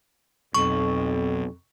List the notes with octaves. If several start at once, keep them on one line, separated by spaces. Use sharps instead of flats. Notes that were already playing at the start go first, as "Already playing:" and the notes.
B1 F2 C#6